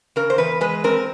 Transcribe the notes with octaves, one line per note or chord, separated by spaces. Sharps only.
C#3 A#4
C5
E2 B4
G#3 B4
C4 A#4